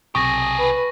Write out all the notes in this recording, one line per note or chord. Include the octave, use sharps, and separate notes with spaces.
B1 C3 G4 G#4 C#6 D#6 A#6
B4